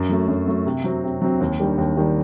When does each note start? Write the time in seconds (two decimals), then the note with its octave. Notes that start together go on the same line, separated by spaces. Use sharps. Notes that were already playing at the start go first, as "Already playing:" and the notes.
Already playing: F#2
0.09 F#3 A3
0.28 F#2
0.47 F#3 A3
0.66 C3
0.84 F#3 C4
1.04 C3
1.22 F#3 C4
1.41 D#2
1.60 D#3 G3 D4
1.78 D#2
1.97 D#3 G3 D4